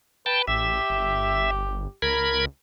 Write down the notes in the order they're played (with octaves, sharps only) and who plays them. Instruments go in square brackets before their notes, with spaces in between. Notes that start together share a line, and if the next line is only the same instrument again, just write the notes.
[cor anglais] B4 [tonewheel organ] G5 A5
[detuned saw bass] A1 [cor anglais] G4 [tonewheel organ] E5
[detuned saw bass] G1
[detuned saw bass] C#2 [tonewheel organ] A#4 B5 G#6